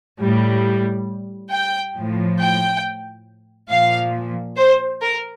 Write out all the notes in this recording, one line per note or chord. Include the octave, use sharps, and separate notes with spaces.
A2 G3
G5
A2 F3
G5
A#2 F3 F5
C5
A#4